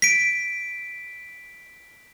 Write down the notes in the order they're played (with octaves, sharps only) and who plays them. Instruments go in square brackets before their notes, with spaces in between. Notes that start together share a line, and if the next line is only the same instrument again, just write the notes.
[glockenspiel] B6 D7